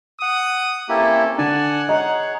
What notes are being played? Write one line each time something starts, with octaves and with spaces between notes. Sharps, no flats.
F#5 D#6
A#3 C4 C#4 E4 G4 A4
D3 D5 F#5 G#5 A5
D#4 G#4 C#5 D#5